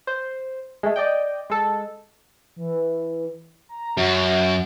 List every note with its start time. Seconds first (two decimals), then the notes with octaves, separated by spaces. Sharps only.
0.07 C5
0.83 G#3 A3
0.96 D5 D#5 G5
1.50 G#3 A4
2.56 E3
3.69 A#5
3.97 F#2 F#4